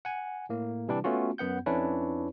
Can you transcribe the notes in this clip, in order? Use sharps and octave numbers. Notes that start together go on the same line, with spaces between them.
F#5 G#5
A2 A#3
C3 E3 G3 D4 G4
A3 B3 C#4 F4 F#4
F#2 B3 F#5 G6
F2 C#4 D4 E4 B4 C#5